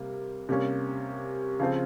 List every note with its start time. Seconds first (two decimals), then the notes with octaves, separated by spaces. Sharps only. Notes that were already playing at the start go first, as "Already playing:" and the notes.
Already playing: C3 G3 A#3
0.49 C3 G3 A#3 C#4
1.60 C#3 F3 C4 F4